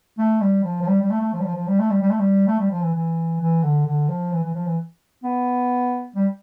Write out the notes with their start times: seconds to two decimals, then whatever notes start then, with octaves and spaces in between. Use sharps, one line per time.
0.18 A3
0.41 G3
0.64 F3
0.81 F3
0.88 G3
1.02 G3
1.10 A3
1.21 A3
1.33 F3
1.40 G3
1.45 F3
1.56 F3
1.68 G3
1.79 A3
1.90 G3
2.02 G3
2.10 A3
2.19 G3
2.47 A3
2.59 G3
2.71 F3
2.82 E3
2.94 E3
3.40 E3
3.63 D3
3.86 D3
4.09 F3
4.33 E3
4.44 E3
4.55 F3
4.67 E3
5.24 B3
6.16 G3